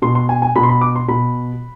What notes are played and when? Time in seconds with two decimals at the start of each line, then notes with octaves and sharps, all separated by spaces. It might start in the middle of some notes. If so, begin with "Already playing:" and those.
0.02 B2 C6
0.15 C6
0.29 G#5
0.42 G#5
0.56 B2 B5
0.63 C6
0.69 B5
0.81 D6
0.96 C6
1.08 B2 B5